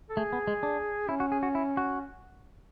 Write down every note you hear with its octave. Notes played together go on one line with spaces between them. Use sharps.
A4
A3 G#4
B3
G#3
D4
C#4 E4
F#4
G#4
F#4
E4
F#4